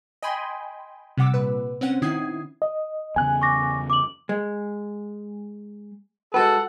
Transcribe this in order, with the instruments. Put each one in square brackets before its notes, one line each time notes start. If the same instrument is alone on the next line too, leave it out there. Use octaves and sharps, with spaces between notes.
[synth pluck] D#5 G5 G#5 B5 C6
C3 G3 F#5 D6 E6
A#2 B4
C4 C#4 F#5
D#3 D#4 E4 D#6 G#6 C7
[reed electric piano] D#5
[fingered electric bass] E2 C#3 [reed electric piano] G#5 F#6
[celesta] C#6 D6 A#6
D6 F#7
[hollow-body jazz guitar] G#3
[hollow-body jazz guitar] G#3 F#4 B4 [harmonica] A4 [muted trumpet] F#5